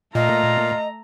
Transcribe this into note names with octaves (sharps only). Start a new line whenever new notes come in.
A#2 A3 F4 D#5 A#5